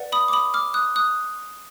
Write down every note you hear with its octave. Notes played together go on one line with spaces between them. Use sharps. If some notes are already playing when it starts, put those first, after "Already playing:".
Already playing: B4 D5 F#5
B5 D#6
D6
B5 D#6
D6 F6
D#6 F#6
D#6 F#6